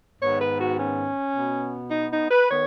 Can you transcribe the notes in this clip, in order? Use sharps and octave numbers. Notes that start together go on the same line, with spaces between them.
G#2 D#3 B3 C#5
B4
F#4
C#4
B2 B3
D#4
D#4
B4
D#3 B3 C#5